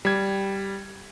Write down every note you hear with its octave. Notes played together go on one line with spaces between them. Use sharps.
G3 G#6